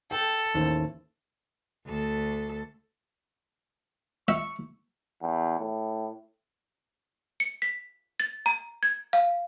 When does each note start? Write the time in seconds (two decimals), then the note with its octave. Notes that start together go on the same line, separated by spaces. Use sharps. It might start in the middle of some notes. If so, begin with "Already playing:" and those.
0.11 A4 G5
0.54 A1 D#2 C5
1.86 D2 A4
4.28 E5 C#6
5.22 E2
5.59 A2
7.40 C#7
7.62 B6
8.20 A6
8.46 A#5
8.83 G#6
9.13 F5